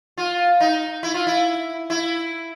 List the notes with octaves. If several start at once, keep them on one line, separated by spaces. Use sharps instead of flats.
F4
D#4
E4
F4
E4
E4